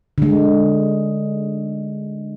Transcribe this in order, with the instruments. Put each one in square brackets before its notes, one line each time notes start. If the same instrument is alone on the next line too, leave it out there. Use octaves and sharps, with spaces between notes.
[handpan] D3 G#3